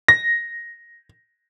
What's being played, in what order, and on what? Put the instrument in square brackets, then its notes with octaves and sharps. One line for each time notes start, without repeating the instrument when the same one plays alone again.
[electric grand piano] A#6